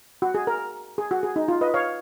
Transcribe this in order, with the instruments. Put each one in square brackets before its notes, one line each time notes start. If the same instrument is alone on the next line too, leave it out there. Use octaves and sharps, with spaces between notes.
[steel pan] F#4
G#4
A#4
G#4
F#4
G#4
D#4
F4
B4 D#5
C#5 F5